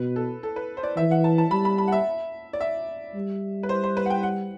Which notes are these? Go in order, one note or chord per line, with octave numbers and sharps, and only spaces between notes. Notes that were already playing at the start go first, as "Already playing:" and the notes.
Already playing: B2 B4
A4
A4
B4
C5
D5
E3 E5
F#5
A5
A5
G3 B5
B5
B5
F#5
E5
D5
E5
G3
B4
C5
C5
B4
F#5
G5
F#5